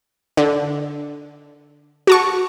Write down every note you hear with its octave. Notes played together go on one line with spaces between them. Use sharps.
D3
F#4 A5 C#6